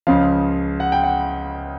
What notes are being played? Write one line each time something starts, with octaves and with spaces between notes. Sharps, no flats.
C#2 C#3 F3 F5
F#5
G5
F#5